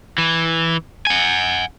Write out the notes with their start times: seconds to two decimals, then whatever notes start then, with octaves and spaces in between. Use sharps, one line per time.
0.18 E3
1.07 F#5 G#5